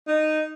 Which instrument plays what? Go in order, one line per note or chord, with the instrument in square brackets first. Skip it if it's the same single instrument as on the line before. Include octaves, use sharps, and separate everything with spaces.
[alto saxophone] D#4